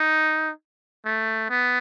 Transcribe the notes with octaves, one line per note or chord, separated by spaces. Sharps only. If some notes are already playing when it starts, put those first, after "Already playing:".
Already playing: D#4
A3
B3